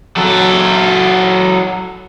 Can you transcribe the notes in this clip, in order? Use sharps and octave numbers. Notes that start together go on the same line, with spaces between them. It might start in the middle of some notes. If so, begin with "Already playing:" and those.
F#3 A4